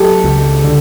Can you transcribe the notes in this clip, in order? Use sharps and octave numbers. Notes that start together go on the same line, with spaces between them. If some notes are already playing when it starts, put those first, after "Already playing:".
Already playing: F#3 G4 A4
C#2
D3